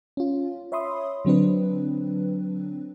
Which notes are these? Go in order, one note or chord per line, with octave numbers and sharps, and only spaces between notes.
C#4 F4
C#5 E5 B5 C6 D#6
D3 F#3 C4 D4 B4